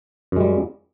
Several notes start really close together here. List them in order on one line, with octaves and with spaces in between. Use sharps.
F#2 G#3 G3